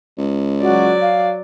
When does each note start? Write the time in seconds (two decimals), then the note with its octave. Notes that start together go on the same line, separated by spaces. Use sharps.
0.18 C#2
0.62 F#3 F#4 D5
1.01 F5